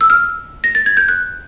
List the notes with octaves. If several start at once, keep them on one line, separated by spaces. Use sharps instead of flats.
E6
F6
A#6
A6
G#6
G6
F#6